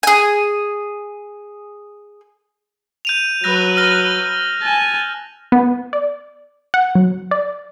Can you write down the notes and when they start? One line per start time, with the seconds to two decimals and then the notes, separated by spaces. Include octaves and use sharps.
0.03 G#4 G#5
3.05 G6 D#7 F7
3.44 F#3 B4 E6 F#6 A#6
3.77 F6 A#6
4.63 G#5 A5
5.52 B3
5.93 D5
6.74 F#5
6.95 F#3
7.31 D5